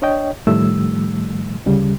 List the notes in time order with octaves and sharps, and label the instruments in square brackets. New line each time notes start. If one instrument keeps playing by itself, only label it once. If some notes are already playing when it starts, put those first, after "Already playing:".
[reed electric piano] D4 C#5 D#5 G5
A2 D#3 F3 G3 A3 E6
D2 C#3 G3